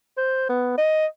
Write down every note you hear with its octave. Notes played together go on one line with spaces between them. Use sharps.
C5
B3
D#5